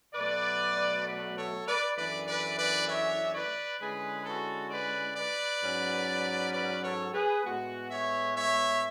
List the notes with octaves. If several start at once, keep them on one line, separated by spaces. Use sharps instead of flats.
B2 F#3 A3 B4 D5
B4 D5
A4 C#5
B4 D5
F#2 E3 A3 D4 B4 D5
B4 D5
B4 D5
C#5 E5
B4 D5
D3 G#3 C#4 E4 G#4 B4
F#4 A4
B4 D5
B4 D5
G#2 F#3 C#4
B4 D5
A4 C#5
G#4 B4
A2 G#3 B3 F#4
C#5 E5
C#5 E5